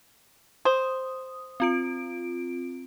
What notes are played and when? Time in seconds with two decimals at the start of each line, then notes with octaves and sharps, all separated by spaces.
0.65 C5 D#6
1.60 C4 F4 D7